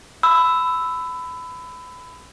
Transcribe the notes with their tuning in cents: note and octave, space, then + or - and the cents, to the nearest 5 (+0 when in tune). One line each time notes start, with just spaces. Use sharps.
B5 +25 E6 +0